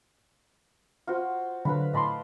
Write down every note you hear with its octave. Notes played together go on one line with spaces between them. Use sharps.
F4 F#4 C5
D3 F#3 B4 F5 B5
A2 D#5 A5 B5 C6 D6